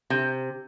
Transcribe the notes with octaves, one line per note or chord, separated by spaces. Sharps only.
C3